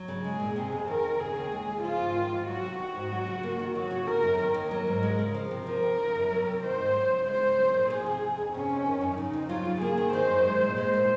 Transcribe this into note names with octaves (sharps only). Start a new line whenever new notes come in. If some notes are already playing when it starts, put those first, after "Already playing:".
Already playing: F#3
C#3
G#3 G#4
A#2
C3
F2
D#3 A#4
F2
C#3 G#4
D#2
G#3
C#3
F3 F4
G#2
D#3
G#2
F#3 F#4
C3
D#3 F#4
G#2
F#3
C#3
A#3
D#3
F#3 F#4
C#3
C#3 A#4
F#2
D#3 A#4
D#2
F#3
G#2
G#3
C#3
F3
C3
F3 A#4
C3
C#3
F#2
F#3
C3
D#3 C5
G#2
F#3
C#3
G#3 C5
C#3
F#3
A#2
F3 G#4
C3
C3
F2
C3 C#4
F2
D#3
F#2
C#3 D#4
F2
F#3 F4
C#3
A#3 G#4
D#3
D#3 C5
F#2
G#3
A#2
G#3 C5
A#2